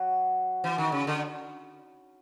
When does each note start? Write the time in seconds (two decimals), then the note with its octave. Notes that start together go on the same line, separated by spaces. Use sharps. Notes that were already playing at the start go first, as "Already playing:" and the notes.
Already playing: F#3
0.64 E3
0.78 D#3
0.92 C#3
1.07 D3